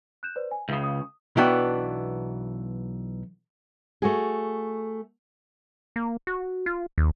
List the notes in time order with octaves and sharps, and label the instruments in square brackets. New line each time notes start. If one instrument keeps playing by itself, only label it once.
[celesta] F#6 G6 E7
B4 C5 D5
G#5
[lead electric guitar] C#2 C#3 [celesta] E5 D#6
[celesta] D#6
[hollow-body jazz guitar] B1 E3 B3 D4 F#4 G5
[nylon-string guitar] A3 F#4 G#4
[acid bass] A#3
F#4
F4
D#2